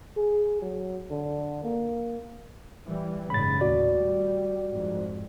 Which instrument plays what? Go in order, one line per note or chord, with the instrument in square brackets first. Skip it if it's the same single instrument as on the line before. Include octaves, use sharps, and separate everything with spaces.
[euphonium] G#4
F#3
D3
A#3
[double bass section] E3 G3
[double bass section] F#1 G#2 C#3 [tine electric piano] B5 A6
[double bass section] D#2 A2 [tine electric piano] F#4 D5
[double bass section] G3
F2 G#2